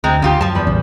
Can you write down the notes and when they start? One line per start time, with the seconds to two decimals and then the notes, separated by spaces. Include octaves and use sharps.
0.04 D2 G#3 C4 A#5
0.22 C#3 D#4 F4 G4
0.41 F#2 F3 F4 A5
0.55 E2 G3 B5
0.67 A1